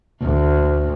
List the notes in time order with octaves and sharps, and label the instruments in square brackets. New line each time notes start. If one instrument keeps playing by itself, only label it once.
[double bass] D2